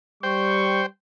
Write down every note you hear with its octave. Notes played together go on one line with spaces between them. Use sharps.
G3 C5 G5 C#6